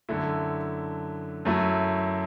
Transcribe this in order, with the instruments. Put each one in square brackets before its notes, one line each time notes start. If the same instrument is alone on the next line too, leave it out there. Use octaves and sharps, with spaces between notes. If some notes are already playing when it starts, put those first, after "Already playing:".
[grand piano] F#2 D3 A3 E4
F#2 F#3 A3 E4